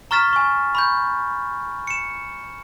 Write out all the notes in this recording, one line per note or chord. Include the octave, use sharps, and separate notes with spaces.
A#5 C#6 F6 A6 B6 E7
G#5 C#6
B5 C#6 G6
C#7 E7